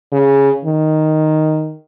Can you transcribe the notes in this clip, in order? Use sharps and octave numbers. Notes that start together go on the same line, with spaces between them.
C#3
D#3